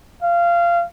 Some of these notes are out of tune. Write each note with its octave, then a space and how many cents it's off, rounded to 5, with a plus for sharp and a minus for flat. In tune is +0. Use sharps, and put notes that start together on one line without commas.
F5 -20